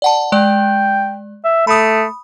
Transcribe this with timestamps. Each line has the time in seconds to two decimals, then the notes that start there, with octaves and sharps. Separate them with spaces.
0.02 D5 F#5 A5
0.32 G#3 D5 G5
1.44 E5
1.67 A3 B5 D#6